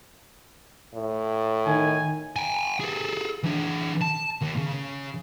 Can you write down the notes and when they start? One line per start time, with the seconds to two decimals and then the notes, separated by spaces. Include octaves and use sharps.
0.95 A2
1.67 D#3 G#5
2.36 G5 G#5
2.80 G#4 A4
3.43 E3 D4
4.01 A5
4.41 D#2
4.57 C#3